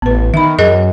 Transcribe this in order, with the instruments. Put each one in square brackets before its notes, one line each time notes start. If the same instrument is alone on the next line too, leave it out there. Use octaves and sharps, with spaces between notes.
[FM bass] A1 [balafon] B3 B4
[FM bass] D#3 [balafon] E5 B5
[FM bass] F#2 [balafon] G#4 A#4 D#5